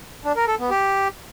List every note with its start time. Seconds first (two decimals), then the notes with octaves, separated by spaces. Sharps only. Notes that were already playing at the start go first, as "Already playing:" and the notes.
0.25 D4
0.36 A#4
0.47 A4
0.59 B3
0.70 G4